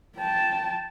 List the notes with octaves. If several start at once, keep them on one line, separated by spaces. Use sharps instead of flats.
G5 A5